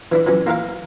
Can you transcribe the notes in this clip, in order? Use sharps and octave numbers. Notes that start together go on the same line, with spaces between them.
E3 D4 E4
E3 F#3 C#4
A#3 E4 A#4 F5